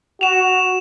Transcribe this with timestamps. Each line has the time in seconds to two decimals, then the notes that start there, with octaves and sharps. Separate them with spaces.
0.21 F#4 E7 F7